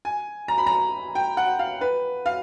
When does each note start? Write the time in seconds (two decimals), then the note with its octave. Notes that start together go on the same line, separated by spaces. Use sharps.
0.05 G#5
0.48 A#5
0.58 B5
0.67 A#5
1.15 G5
1.37 F#5
1.59 F5
1.81 B4
2.26 F5